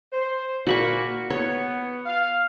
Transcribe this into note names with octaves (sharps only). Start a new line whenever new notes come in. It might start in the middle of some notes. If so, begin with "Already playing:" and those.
C5
A#2 A#3 F#4 B5 C#6
B3 C#5
F5